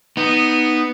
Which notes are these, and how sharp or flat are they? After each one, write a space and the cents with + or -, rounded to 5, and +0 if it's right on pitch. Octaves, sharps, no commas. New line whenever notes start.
B3 +0 D#4 +0